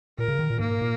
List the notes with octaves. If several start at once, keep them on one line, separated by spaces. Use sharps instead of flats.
A#2 A#4
C#3
D#3
A#2
G#2 A#3
A#2